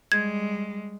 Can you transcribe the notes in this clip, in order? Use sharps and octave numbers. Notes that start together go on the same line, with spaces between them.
G3 G#3 G#6